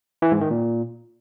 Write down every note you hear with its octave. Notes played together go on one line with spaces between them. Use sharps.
E3
G#2
D#3
A#2